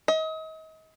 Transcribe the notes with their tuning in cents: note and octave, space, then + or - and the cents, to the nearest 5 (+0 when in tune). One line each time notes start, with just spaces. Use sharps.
D#5 +35